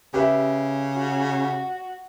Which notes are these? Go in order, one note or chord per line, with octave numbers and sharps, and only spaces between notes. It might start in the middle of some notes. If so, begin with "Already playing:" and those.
C#3 G4 B4 E5
F#4